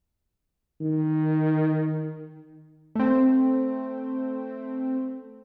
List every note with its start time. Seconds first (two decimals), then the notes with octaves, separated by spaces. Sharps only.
0.81 D#3
2.95 A3 C4